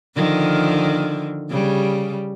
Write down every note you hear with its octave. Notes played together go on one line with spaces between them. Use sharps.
D3 D#3 F3
C#3 G3